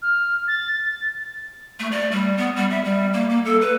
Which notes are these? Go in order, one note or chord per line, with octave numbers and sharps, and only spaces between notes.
F6
A6
A3
D5
G3
B3
G3
E5
G3
A#3
A#3
A4
B4